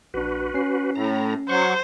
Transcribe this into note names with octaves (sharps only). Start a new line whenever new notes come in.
A#1 D4 F#4 B4
C#4 C7
A2 A#5
F#3 C5 F#5 C#6